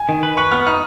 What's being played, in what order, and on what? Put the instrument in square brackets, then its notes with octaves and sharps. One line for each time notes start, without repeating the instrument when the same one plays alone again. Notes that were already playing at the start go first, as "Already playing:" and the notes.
Already playing: [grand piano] G#5
[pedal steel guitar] D#3
B4
[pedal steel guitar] B4 [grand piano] C#6
[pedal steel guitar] B3 [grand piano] F6
[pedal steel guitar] D#4 [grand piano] F6